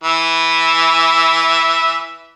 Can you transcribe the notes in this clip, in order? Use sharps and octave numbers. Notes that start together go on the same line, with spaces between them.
E3 E5